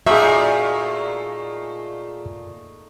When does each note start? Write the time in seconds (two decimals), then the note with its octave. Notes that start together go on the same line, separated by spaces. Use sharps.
0.06 A#2 A3 D#4 F#4 G#4 E5 F5 C#6